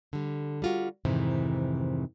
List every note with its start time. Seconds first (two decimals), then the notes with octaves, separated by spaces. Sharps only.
0.13 D3 G3
0.62 G3 F4 F#4
1.05 F2 G#2 C3 D#3 E3